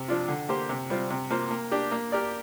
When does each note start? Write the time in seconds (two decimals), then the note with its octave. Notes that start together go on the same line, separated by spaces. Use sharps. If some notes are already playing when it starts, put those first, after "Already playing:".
Already playing: C3
0.08 F3 D4 F4
0.28 D3
0.49 A#3 G4 C5
0.69 C3
0.90 G3 C4 F4
1.10 C3
1.30 A#3 F4 C5
1.51 A#3
1.72 D4 G4
1.91 A#3
2.12 G4 A#4 D5